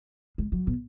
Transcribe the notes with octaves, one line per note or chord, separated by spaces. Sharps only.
G#3
F#3
B2